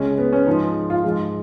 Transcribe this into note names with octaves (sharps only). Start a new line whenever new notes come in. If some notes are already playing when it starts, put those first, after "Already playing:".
Already playing: C#2 C#3 G#3 C#4
B3
C#4
G#2 F3 G#3 D#4
F4
G#2 F3 G#3